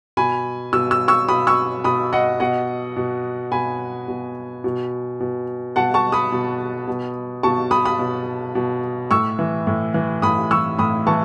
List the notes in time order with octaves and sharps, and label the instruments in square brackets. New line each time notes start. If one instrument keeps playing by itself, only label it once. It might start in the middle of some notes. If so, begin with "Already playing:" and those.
[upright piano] B2 G#5 B5
B2 E6
E6
C#6 E6
B2 B5 D#6
C#6 E6
B2 B5 D#6
D#5 F#5
B2 D#5 F#5
B2
B2 G#5 B5
B2
B2
B2
B2 F#5 A5
A5 C#6
B5 D#6
B2
B2
B2 A5 C#6
B5 D#6
B5 D#6
B2
B2
A2 C#6 E6
E3
A2
E3
A2 B5 D#6
E3 C#6 E6
A2 B5 D#6
E3 A5 C#6